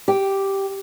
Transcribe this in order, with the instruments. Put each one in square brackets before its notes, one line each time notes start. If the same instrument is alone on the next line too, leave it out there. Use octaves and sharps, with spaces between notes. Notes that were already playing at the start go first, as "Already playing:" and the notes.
[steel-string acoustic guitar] G4